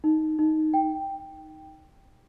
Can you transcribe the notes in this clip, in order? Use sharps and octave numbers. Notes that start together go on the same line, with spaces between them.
D#4
D#4
G5